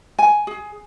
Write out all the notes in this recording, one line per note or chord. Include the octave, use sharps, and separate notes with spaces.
G#5
G#4